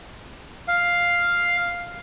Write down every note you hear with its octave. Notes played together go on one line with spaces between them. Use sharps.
F5